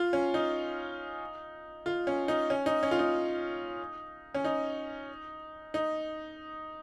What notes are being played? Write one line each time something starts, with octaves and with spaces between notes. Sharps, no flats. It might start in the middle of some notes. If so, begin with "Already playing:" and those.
Already playing: F4
C#4
D#4
F4
C#4
D#4
C#4
D#4
C#4
F4
D#4
C#4
D#4
D#4